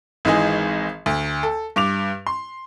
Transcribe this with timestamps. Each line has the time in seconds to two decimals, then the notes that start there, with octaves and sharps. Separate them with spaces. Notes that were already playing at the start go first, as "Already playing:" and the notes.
0.25 G#1 E3 G#3 D#4 G#4
1.06 D2
1.43 A4
1.76 G2 D6 F7
2.27 C6